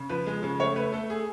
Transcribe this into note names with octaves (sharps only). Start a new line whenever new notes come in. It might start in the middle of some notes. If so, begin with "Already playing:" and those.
Already playing: C#3
F3 B4
G#3
C#3
A3 C#5
A3 B4
A3 A4
G#4